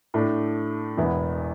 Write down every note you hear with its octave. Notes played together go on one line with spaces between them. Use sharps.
A2 A3 D4
E1 E2 E3 B3 E4